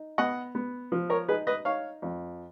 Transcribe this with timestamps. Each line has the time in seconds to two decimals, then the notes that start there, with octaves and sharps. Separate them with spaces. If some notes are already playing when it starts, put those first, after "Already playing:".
Already playing: D#4
0.18 B3 D#5 F#5
0.55 B3
0.92 F3
1.10 A#4 C#5
1.28 D#4 G#4 B4
1.47 B4 D#5
1.65 D#4 C#5 F5
2.02 F2